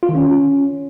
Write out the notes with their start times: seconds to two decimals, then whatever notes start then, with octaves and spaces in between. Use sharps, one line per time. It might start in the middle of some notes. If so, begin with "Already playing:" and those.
0.03 F4
0.09 D#3
0.15 C#4